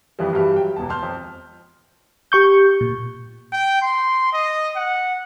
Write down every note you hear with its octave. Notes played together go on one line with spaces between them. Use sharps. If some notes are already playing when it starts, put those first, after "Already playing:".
F2 E3 F3 G3
G2 E3 F#4 G4 B5 F6
F#3 G5
E1 E2 A5
A5 C6 F6 G6
F2
G4 C#6 G6
A#2
G5
C6
D#5
F#5